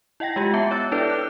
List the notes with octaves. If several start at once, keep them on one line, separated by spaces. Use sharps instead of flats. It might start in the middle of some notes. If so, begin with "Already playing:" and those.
E4 D#5 F#5 G5 A#6
G#3 F4 G4
B3 E5 A5 C#7
C#5 E6 A6
D4 E4 A4 B4 D5
D6 F#6